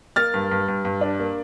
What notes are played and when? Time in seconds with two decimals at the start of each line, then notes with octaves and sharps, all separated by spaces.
0.16 A#3 F6 A6
0.34 G2
0.51 G2
0.68 G2
0.85 G2
1.01 D4
1.20 A#3